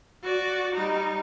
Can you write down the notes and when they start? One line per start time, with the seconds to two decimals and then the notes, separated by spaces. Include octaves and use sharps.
0.23 F#4 D5
0.74 G3 D#4